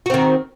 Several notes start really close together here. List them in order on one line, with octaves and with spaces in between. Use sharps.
F#4 C4 D#3